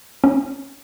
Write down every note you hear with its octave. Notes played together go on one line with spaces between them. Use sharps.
C#4